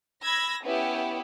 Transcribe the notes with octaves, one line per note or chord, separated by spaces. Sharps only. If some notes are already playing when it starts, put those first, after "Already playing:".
B5 E6 G#6 A#6
B3 C#4 E4 G4